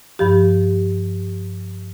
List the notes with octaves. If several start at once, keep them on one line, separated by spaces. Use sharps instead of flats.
G2 F3 G4